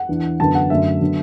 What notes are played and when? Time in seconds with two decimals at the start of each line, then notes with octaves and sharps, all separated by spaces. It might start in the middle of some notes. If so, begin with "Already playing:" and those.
Already playing: F#5
0.09 E2 E3 D4
0.40 F#2 D3 B3 A5
0.55 F#5
0.70 F#2 D3 A3 D4 E5
1.01 D3 F#3 B3